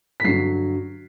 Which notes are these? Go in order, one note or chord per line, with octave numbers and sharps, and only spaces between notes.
B6
G2 D3 F#3 C7